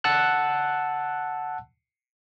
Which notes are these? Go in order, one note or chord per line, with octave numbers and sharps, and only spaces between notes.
F#5 A5 E6 F#6